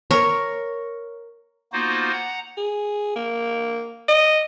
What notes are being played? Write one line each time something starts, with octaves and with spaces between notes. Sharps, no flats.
A#4 C#5
A#3 B3 D#4 F4 F#4 C5
F#5 A#5
G#4
A#3
D#5